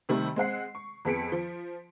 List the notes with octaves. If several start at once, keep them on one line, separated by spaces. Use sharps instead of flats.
C3 D#3 G3 A3
G#3 C4 F#5 C7
C#6
F2 B3 G#4 B6 C#7 D7
F3